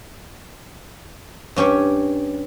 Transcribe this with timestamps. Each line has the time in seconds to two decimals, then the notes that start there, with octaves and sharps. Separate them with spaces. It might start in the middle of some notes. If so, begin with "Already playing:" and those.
1.56 G2 C#4 G4 C#5